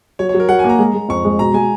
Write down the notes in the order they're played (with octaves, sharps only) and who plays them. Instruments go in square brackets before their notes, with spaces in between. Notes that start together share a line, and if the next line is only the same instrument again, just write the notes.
[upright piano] F#3 [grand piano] C#5
[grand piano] C#5
[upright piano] F#3
[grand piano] A#4
[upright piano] F#3 [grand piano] F#5
[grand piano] G#5
[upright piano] A#3 [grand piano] A#5
[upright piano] G#3
G#3
[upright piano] F2 [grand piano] C#6
[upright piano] G#3
[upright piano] B2 [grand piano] A#5
[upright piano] G#3 [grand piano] G#5